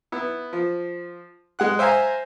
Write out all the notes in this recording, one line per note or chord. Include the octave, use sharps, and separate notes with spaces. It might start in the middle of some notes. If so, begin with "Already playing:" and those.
B3 E4
F3
G#3 F#5 F#6
C5 E5 F5 G#5 A#5